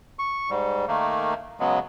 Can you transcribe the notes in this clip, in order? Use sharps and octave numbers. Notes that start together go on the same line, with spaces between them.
C#6
G#2 G3
D#3 A3 A#3
C#3 F#3 G#3 B3